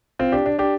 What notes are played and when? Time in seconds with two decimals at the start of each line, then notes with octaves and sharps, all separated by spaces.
0.19 C4 F4
0.32 D4 G4
0.46 D4
0.59 D4 G4